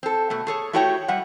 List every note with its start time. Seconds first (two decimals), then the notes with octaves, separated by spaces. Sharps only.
0.03 C4 A4
0.30 B2 A3
0.47 G#4 A4 C#5
0.73 A3 E4 F#4 G4 C#5 G5
1.08 G3 E5 F#5